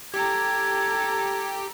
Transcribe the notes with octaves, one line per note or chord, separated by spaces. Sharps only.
G4 A4 A#5 G#6